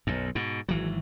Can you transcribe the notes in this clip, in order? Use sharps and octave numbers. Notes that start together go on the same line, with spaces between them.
B1 F#2
G#2 B2
G#1 E3 F#3